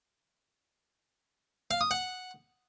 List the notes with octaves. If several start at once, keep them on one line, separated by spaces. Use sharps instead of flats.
F5
D#6
F#5